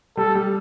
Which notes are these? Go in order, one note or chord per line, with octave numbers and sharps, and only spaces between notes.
G3 A4
G3